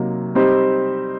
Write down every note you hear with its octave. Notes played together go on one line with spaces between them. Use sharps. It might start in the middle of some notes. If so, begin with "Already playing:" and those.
Already playing: C3 F#3 A#3 D#4
G3 C4 D#4 G4 C5